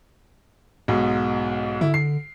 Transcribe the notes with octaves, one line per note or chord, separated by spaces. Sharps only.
B1 G#2 B2
D3 E4
C7